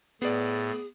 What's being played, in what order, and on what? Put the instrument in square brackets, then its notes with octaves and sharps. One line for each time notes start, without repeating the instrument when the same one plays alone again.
[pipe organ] A2 [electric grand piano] B3 D5 [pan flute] G#4